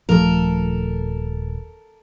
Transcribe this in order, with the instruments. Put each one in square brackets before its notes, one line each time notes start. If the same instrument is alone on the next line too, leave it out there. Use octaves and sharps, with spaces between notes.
[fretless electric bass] D#1 F3 A3 [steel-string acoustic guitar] A4 A#4